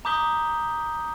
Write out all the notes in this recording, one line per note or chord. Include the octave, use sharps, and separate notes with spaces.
A#5 D6 D#6 G6 B6 G7